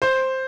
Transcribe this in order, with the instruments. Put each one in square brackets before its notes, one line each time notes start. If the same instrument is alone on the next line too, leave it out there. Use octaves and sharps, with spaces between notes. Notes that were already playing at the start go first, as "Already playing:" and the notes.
[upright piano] C5